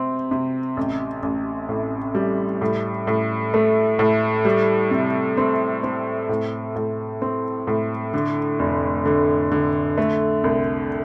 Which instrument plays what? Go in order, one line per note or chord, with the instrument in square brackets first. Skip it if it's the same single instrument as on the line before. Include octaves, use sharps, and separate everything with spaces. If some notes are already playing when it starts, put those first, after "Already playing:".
Already playing: [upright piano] C3 C4
C3
A1
A1
A2
G3
A2
A2
A3
A2
G3
C3
C4
C4
A2
A2
C4
A2
D3
F1
D3
D3
A3
C2